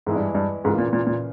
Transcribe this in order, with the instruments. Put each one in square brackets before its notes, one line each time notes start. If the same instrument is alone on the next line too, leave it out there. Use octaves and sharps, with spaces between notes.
[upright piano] E2 E3 G#3 E4 [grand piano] G#2
[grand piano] G2
G2
[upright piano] C#2 C#3 E3 A#3 F4 [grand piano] G#2
[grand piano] A#2
A#2
A#2